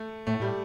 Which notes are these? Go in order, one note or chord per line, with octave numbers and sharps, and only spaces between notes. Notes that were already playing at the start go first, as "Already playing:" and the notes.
Already playing: A3
A2 A3
A2 G3